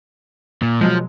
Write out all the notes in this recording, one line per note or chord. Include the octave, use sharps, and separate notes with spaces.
A#2
B2 F3 F#3 G#3